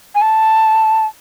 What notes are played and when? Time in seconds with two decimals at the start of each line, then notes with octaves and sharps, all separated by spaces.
0.15 G#5
0.21 A5